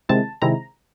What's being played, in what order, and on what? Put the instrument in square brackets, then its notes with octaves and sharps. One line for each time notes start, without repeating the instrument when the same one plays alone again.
[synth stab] C3 D#3 G#3 C4 E4 A5
C3 D#3 G#3 C4 E4 A#5